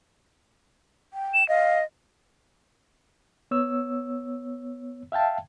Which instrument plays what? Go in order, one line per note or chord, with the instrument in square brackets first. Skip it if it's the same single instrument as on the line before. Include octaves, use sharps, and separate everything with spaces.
[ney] G5
[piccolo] E7
[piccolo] D#5 [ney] F5
[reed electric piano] B3 C#5 E6
E5 F5 G5 A5